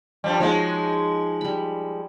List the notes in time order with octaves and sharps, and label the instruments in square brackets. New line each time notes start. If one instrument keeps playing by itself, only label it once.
[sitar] G2 F3 G3
[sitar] F3 G#3 [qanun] D#4 F#4 C#5
[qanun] G3 B5